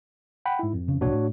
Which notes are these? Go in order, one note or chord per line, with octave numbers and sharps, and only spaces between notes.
F#5 G5 B5
G#2 E4
F2
C#3
D1 C2 A#2 D4 F#4 C#5
A2